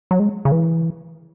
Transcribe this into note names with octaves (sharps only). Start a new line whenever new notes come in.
F#3
G#3
C#3
E3